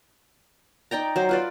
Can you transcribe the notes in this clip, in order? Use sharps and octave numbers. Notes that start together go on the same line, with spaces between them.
D#4 D5 G5 A#5
F#3 C5
F4 B4 D5